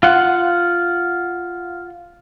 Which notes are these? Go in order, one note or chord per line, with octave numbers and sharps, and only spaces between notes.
F4 F#5